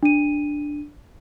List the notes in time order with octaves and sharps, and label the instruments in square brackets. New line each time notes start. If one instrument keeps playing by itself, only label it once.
[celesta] D4 D#7